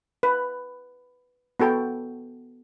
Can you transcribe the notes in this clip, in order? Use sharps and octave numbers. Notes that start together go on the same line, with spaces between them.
B4
B3 F#4 A4 G5